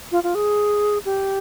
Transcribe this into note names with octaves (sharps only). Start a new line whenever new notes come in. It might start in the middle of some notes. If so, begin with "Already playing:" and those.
F4
F4
G#4
G4